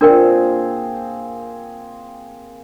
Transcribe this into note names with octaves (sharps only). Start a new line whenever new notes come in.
A#2 C4 D4 G#4 A#4 G5